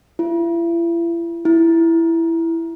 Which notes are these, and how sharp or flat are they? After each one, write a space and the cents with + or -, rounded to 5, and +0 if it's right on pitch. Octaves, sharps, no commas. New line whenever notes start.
E4 +40
E4 +5